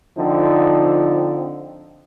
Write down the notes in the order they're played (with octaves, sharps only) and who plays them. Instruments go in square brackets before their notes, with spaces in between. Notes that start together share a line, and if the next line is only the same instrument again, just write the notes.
[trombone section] D3 F3 C4 D#4